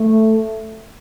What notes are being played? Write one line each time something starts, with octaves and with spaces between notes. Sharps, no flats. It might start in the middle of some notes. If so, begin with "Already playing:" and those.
Already playing: A3